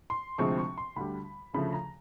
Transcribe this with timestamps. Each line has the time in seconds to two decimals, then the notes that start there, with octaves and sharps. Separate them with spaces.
0.10 C6
0.38 D2 C3 F3 G#3 C4 C#6
0.58 C#6
0.78 C6
0.96 D2 D3 G3 B5
1.53 D2 C#3 F3 A3 B5
1.73 A#5